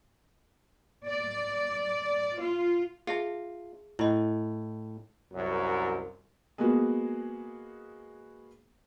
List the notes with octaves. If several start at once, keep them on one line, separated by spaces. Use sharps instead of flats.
D5
F4
F4 G#4 E5 A5
A2 E4 D#5
C2 F#2
G#3 A#3 B3 F#4 G#4